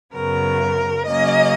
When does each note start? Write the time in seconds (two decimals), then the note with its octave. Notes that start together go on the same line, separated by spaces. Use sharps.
0.14 F#2 C#3 F#3 B3 A#4
1.06 C#3 F#3 A#3 C#4 D#5